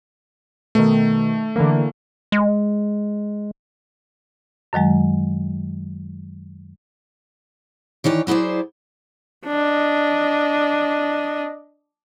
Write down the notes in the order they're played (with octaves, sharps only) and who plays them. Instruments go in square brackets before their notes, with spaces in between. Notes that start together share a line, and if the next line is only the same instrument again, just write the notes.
[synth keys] B2 D#3 [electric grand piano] A3
[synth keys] D3 E3 A#3
[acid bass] G#3
[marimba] F#2 D#3 F#3 G#3
[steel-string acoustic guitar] D#3 E3 C#5 D5
F#3 E4 G#4 C5 D5
[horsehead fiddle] D4 D#5